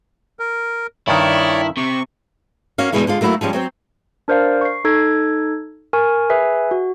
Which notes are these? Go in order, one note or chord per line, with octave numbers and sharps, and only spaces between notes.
A#4
G2 D#3 E4 C#5 D5
C3 C#6
A#3 C#4 F#4 F5
E2 G#2 B2 E3 G#3 A3
D3 G#3 F4
F#3 A3 A#3 E4 F#4 A4
F3 G3 G#3 C#4
F#3 C4 C5
D4 A#4 C5 D5 F5
C#6 C7
D#4 A4 G#6
A#4 G#5 C#6
G#4 B4 E5 G#5
F#4